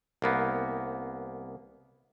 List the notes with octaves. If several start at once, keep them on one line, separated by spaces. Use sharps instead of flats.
C2 A#3 B3